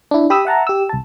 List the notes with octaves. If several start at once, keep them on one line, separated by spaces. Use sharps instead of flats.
D4 E4
G4 B5 D#6 E6
E5 F#5 A5 A#5
G4 E6
C2 A5